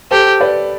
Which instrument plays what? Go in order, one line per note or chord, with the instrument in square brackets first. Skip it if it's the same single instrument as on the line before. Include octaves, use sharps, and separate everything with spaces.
[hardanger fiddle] G4 [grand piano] A4 C5
[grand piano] B4 D5